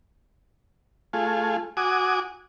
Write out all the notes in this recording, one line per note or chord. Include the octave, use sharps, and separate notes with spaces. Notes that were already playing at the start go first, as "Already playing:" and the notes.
A3 F4 G#4
F#4 G#5 D6 D#6